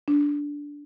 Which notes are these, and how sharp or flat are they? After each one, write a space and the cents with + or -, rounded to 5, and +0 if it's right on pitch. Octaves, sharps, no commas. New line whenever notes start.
D4 -10